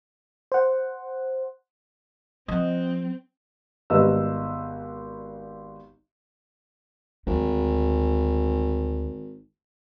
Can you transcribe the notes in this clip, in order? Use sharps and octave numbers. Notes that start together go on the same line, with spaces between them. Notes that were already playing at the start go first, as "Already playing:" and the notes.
C5 F#5
F3 C4 D#5 F#5
G#1 G3 B3 B4 D#5 E6
G#1 D2